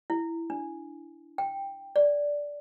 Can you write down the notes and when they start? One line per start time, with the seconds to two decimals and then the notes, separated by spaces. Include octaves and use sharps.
0.10 E4
0.50 D4
1.38 G5
1.96 D5